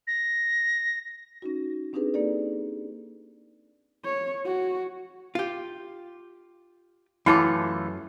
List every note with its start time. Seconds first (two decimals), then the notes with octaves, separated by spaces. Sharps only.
0.07 A#6
1.42 C#4 D#4 F#4
1.93 C4 D4 D#4 G4 G#4 B4
2.14 A#3 D#4 G4 A4 D5
4.05 C#5
4.45 F#4
5.35 F4 G4
7.26 F#2 E3 A3 E4 F4 A4 D6